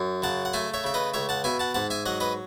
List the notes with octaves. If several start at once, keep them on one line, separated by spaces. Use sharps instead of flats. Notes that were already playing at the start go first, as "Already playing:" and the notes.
Already playing: F#2
C#3 F#5 A5
F#5
A3 E5 G#5
C#5 E5
C#3 E5
B4 D#5
C#2 C#5 E5
F#5 A5
B2 E5 G#5
F#5 A5
G#2 F#5 A5
E5 G#5
F#3 D#5 F#5
B4 D#5